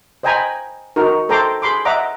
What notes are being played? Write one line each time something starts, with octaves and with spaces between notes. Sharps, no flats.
C5 D#5 G5 G#5 A#5 B5
D#4 F#4 A#4
A4 C5 G5 A#5 C6 D6
G#4 B5 C6 D6
D#5 E5 F#5 A#5 D6